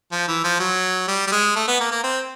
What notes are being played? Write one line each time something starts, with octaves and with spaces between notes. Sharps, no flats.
F3
E3
F3
F#3
G3
G3
G#3
A3
B3
A#3
A#3
C4